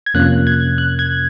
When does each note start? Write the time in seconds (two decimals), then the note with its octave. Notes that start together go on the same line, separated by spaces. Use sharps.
0.06 G#6
0.14 F2 C3 F3 A#3 C#4 F#6
0.47 G#6
0.78 F#6
0.99 G#6